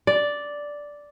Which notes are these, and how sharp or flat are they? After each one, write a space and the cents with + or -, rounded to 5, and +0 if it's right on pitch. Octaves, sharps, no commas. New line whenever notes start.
D5 -5